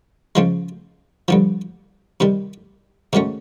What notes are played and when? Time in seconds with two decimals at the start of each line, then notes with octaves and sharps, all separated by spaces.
0.35 C#3 F3 G#3
1.28 G2 D3 F3
2.20 C3 D#3 G3
3.13 G#2 D#3 F#3 A3 C#4